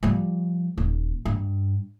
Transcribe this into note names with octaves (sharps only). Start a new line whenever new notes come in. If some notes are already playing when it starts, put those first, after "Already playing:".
F3 G3
D#1
G2